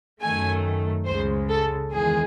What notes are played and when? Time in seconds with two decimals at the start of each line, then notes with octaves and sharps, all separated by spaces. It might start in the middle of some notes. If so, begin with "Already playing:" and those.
0.21 F#2 D#3 A3 G#5
1.06 C#2 C#3 G#3 C5
1.49 A4
1.91 E2 D#3 G#3 G#4